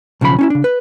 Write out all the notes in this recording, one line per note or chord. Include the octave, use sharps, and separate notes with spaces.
B1 C#3 F3 G#4 B5
C#4 D#4 E4
C#3 D4
B4